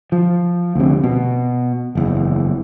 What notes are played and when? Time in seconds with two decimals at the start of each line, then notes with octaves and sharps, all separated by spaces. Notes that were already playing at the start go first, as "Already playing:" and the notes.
0.12 F3
0.75 D2 C3
1.04 B2
1.95 F#1 E2